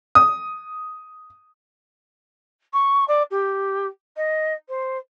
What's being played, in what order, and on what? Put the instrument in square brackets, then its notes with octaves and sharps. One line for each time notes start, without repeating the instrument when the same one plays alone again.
[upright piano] D#6
[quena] C#6
D5
G4
D#5
C5